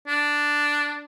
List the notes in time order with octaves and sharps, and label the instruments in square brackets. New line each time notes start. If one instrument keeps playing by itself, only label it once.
[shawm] D4